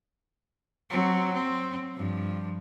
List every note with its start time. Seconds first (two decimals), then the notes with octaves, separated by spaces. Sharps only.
0.90 F#3 C4
1.34 C4
1.95 G2 F3